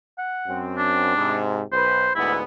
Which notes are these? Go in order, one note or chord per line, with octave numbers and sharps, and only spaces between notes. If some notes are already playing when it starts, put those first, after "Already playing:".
F#5
F#2 C4
D4
G#2 C3
B1 B4 C5
D2 G#2 B3 E4